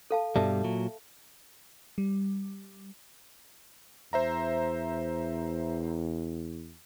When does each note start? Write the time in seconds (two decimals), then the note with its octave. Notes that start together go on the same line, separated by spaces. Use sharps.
0.11 A4 F5 A5
0.36 G2 B2 G3 A4 E5 A5
0.64 A#2 F#3
1.98 G3
4.13 E2 C5 E5 A#5